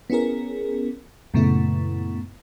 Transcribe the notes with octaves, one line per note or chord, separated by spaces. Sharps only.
B3 C#4 E4 G#4 A#4
F#2 A#2 C#3 A3 B3 E4